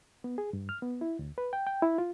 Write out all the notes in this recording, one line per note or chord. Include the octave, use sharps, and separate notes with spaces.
B3
G#4
G2
F6
B3
E4
D2
B4
G5
G5
E4
F4